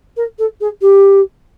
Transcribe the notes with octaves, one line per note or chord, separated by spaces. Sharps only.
A#4
A4
G#4
G4